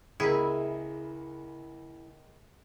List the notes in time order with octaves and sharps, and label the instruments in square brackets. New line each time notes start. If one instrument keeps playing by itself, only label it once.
[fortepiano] C#2 A#3 [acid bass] E4 [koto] G#4